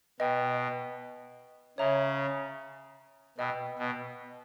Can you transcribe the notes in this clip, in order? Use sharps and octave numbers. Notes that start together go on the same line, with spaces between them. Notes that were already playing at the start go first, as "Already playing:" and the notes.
B2 B4 D#5 G5
C#3 C#5 E5 A#5
B2 B4 D#5 G5 B5 E6
B2